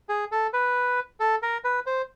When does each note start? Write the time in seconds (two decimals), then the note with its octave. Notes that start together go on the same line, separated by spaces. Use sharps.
0.09 G#4
0.32 A4
0.53 B4
1.20 A4
1.43 A#4
1.64 B4
1.86 C5